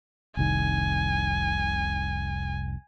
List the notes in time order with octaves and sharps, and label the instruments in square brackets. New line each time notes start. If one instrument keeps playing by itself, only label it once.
[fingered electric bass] F1 C2 D#3 [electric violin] G#5